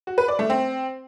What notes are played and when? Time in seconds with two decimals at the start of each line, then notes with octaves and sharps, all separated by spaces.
0.07 F#4
0.18 B4
0.28 D5
0.39 A3
0.50 C4